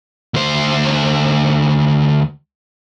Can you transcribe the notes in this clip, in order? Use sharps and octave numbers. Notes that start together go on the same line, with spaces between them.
D2 C5